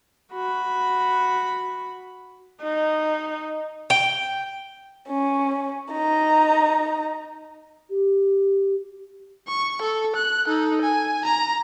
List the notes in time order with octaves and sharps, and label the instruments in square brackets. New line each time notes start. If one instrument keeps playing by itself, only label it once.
[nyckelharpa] F#4 B5
[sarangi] D#4
[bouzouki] G5
[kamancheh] C#4
D#4 A#5
[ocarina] G4
[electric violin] C#6
A4
F#6
D#4 A4
G#5
A#5